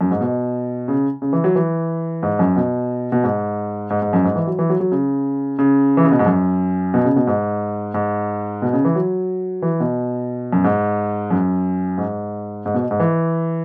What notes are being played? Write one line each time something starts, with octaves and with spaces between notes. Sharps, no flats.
F#2
G#2
B2
C#3
C#3
E3
F#3
E3
G#2
F#2
B2
B2
G#2
G#2
G#2
F#2
G#2
E3
F#3
E3
F#3
F#3
C#3
C#3
E3
C#3
B2
G#2
F#2
B2
C#3
B2
G#2
G#2
B2
C#3
E3
F#3
E3
B2
F#2
G#2
F#2
G#2
G#2
B2
G#2
E3